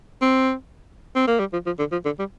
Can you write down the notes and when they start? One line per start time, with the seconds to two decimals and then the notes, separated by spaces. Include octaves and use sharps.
0.22 C4
1.16 C4
1.28 A#3
1.40 G3
1.53 F3
1.66 F3
1.79 D3
1.92 F3
2.05 D3
2.19 G3